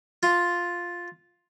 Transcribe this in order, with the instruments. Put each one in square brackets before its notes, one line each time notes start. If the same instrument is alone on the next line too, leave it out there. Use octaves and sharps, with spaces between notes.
[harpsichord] F4